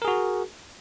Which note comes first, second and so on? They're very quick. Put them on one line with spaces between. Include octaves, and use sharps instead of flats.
A#4 G#4 F#4